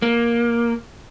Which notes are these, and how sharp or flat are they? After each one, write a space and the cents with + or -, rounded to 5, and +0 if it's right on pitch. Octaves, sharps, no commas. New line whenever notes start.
A#3 +10